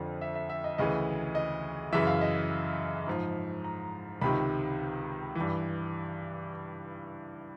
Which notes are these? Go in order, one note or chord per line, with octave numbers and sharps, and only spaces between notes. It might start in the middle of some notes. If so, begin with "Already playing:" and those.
Already playing: F2 D3 F3
E5
E5
E5
D#5
D2 C#3 E3 D#5
D#5
F#2 C#3 E3 E5
F5
D#5
G#2 F3
A#5
C#2 C3 D#3 B5
E3
G2